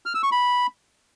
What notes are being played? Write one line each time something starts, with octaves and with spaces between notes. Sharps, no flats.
F6
E6
C#6
B5